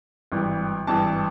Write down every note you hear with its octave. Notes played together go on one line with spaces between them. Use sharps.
G#1 G2 E3
G#1 G2 E3 A5